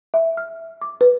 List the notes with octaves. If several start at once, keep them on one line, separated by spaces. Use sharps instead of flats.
E5
F6
D6
B4